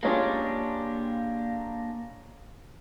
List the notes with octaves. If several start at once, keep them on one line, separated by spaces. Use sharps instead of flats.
G#3 A#3 C#4 D4 F4 G4